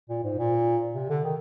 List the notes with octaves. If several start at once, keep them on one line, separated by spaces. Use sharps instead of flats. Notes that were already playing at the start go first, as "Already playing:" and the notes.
A#2
G#2
A#2
C3
D3
D#3